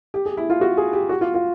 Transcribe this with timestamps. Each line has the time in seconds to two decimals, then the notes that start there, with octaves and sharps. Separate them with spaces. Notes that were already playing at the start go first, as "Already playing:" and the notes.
0.14 G4
0.26 G#4
0.37 E4
0.50 F4
0.61 F#4
0.77 G#4
0.93 G4
1.09 F#4
1.21 F4
1.34 F4